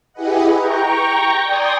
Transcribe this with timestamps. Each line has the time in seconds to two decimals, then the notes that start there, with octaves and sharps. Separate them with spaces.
0.13 E4 G4 G#4 B4 D#5 F#5
0.56 G5 A#5 C#6
1.44 D5 G5 G#5 C6 D#6 A#6